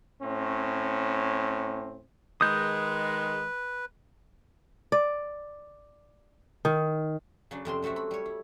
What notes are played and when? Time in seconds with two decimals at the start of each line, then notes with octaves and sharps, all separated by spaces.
0.22 A2 C4 C#4
2.41 D#3 G#3 B4 D#6 G6
4.92 D5
6.65 D#3
7.51 C#3 F#3 D4
7.65 F2 C3 C4 C6
7.82 F#3 A3 C4 F#4 E5
7.96 B5
8.11 G3 C#5
8.26 E4